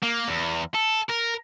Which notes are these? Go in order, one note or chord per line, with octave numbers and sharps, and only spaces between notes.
A#3
E2
A4
A#4